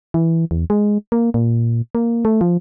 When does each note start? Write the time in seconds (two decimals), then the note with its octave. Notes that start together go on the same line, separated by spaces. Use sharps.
0.14 E3
0.51 E2
0.70 G#3
1.12 A#3
1.34 A#2
1.95 A#3
2.25 A3
2.41 F3